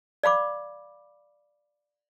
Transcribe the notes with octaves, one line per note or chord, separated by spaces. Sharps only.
D5 F5 B5 D6